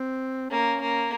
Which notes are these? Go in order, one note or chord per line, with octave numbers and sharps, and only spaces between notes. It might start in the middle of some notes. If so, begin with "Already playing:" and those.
Already playing: C4
A#3 C#4
A#3